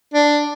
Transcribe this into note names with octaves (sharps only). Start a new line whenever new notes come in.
D4